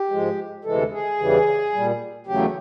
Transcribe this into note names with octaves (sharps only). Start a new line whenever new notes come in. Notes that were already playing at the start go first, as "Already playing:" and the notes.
Already playing: G4
G#2 F3 G#3
D2 C3 E3 G#3 A4
G#4
E2 C#3 E3 G3
A#2 G3
E2 C#3 F#3 A3 G4